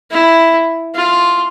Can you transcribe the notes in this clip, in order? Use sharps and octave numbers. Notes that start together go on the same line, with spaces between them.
E4
F4